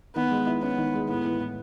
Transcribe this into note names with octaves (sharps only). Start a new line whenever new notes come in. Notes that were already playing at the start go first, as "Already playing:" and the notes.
D#3 B3
G#3
E4
B3 C#4
D#3
G#3
A2 B3
E3
A2